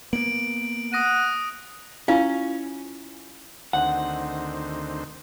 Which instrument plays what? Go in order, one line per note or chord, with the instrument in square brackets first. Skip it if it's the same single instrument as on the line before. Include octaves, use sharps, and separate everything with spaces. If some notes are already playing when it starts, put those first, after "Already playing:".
[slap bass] A#3 B3 [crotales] D7 F#7
[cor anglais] F#5 [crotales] D#6 A#6 D#7
[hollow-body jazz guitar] C#4 [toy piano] E4 F4 F5
[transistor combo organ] D2 D#3 C4 [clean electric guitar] F#5